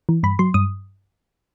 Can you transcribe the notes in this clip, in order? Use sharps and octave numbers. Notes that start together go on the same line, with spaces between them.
E3
G2 B5
F#3 C6
G2 D#6